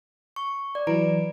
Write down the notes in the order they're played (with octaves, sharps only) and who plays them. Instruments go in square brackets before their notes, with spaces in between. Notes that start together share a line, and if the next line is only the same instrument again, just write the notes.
[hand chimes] C#6
D5
[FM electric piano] E3 F#3 [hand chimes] B4 A#5 D7